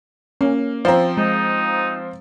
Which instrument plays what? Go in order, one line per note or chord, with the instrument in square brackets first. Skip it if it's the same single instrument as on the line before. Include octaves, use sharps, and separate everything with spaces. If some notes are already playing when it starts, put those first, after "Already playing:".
[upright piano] A#3 [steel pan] C#4
[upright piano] F3 C4 [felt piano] C5 F5 A#5
[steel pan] G#3 [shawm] D#4